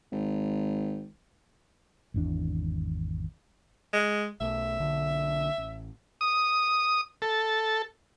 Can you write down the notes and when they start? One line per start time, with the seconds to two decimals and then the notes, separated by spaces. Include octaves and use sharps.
0.12 G#1
2.14 G#1 E2 D4
3.93 G#3
4.40 B1 A3 E5
4.80 B1 D3 D4
5.58 A1
6.21 D#6
7.22 A4